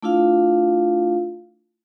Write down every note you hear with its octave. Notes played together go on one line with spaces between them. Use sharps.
A3 D4 E4 F4 F5